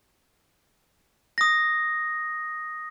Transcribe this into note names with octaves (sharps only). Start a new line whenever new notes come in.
D#6 A#6